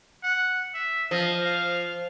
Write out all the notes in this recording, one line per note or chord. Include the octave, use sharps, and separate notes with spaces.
F#5
E5
F3 D#5
F5